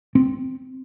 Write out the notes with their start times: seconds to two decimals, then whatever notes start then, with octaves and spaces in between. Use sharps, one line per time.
0.15 C4